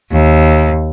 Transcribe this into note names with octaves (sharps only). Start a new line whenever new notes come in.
D#2